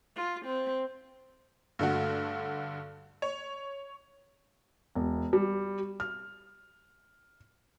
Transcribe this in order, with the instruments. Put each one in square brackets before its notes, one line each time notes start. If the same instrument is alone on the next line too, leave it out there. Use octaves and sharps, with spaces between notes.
[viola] F4
C4
[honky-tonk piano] G2 D3 A3 F#4
C#5
[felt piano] E1
G3
F6